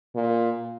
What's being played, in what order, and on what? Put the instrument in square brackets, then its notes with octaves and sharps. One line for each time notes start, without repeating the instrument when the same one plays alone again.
[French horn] A#2